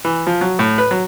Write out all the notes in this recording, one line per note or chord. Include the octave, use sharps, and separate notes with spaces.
E3
F3
F#3
A2
B4
F#3